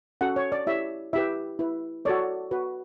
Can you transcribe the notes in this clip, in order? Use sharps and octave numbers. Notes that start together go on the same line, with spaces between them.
C#4 F#4 A4 F#5
C#5
D5
E4 G4 C#5 E5
E4 G4 B4 E5
E4 B4
F#4 A4 C#5 D5
F#4 B4